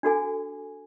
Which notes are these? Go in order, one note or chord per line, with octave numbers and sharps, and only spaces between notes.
D4 F#4 A4 G#5